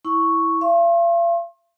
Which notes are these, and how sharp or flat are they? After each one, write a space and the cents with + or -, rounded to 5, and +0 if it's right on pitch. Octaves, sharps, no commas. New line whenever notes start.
E4 -5 C#6 +0
F5 -40 C6 +45